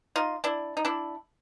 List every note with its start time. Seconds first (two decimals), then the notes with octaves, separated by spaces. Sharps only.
0.16 D#4 F4
0.44 D4 E4
0.77 D#4
0.85 D4 E4